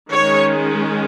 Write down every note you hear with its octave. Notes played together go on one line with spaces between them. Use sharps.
D#3 G#3 C#4 C#5